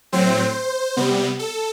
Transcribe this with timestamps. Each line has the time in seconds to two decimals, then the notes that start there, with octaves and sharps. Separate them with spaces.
0.12 A2 F#3 C4 C5
0.97 C3 G3 B3
1.39 A4